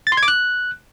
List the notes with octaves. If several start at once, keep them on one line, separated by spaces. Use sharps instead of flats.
A6
C6
G#6
D6
F#6